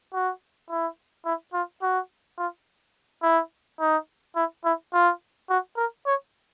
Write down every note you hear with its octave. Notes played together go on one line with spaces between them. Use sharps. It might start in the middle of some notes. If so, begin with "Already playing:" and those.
F#4
E4
E4
F4
F#4
F4
E4
D#4
E4
E4
F4
F#4
A#4
C#5